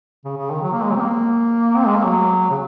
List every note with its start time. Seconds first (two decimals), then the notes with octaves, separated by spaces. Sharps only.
0.25 C#3
0.38 C#3
0.51 D#3
0.62 F#3
0.73 A#3
0.82 G#3
0.91 F#3
0.96 C4
1.01 A#3
1.76 C4
1.85 G#3
1.95 A#3
2.04 F#3
2.51 C#3